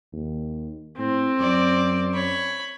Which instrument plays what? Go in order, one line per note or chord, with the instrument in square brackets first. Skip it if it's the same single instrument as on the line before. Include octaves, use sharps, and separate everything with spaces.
[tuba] D#2
[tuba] A2 [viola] C4
[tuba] F#2 [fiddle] D5
[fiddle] C#5 B5